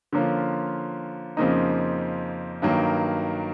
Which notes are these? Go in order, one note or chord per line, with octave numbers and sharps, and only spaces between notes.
D3 F3 A#3 C#4 F4
F2 C#3 F3 A#3 D#4
G2 D#3 F#3 A#3